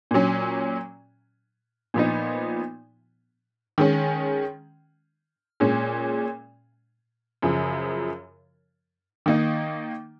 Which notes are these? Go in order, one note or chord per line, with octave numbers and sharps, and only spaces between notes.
A#2 F#3 C#4
A#2 F3 B3 D#4
D#3 G#3 C#4
A#2 G#3 C#4
F#2 C#3 F3
D#3 A#3 D#4